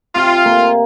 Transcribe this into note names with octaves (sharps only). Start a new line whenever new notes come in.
C3 F4
A#3